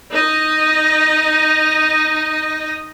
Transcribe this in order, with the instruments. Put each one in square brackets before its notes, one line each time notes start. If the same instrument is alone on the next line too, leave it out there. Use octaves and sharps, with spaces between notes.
[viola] D#4 D#5